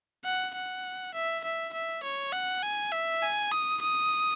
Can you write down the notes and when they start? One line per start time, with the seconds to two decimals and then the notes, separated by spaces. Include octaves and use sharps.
0.25 F#5
0.55 F#5
1.14 E5
1.44 E5
1.73 E5
2.03 C#5
2.32 F#5
2.62 G#5
2.92 E5
3.22 G#5
3.52 D#6
3.81 D#6